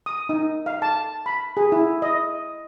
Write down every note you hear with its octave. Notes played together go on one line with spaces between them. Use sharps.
D#6
D#4
F5
A5
B5
G#4
E4
D#5